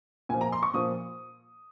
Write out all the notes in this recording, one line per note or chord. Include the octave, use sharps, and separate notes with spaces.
A#2 F3 G#5
A#5
C6
C#6
A#2 F3 D#6